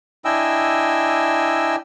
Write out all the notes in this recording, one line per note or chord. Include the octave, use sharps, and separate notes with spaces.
D4 E4 D#5 G5 G#5 E6